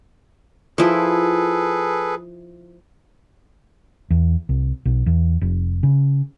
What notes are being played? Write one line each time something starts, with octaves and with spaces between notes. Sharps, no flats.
F3 E4 G#4 A4 B4
E2
C2
B1
E2
F1
C#3